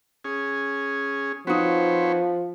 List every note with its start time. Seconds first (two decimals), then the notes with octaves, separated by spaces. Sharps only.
0.24 C#4 G#4
1.47 F3 C4 D#4 F#4 B4 C#5